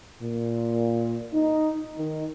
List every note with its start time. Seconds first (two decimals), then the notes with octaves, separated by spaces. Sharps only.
0.22 A#2
1.33 D#4
1.97 D#3